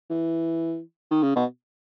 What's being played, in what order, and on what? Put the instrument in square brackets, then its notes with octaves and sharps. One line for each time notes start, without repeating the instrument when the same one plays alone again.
[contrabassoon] E3
D#3
C#3
B2